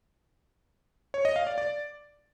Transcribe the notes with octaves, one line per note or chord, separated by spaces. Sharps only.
C#5
D#5
F5
D5
D5